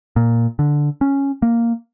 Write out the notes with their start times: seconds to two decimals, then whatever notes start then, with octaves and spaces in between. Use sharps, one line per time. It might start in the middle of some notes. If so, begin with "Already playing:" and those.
0.16 A#2
0.59 D3
1.01 C#4
1.42 A#3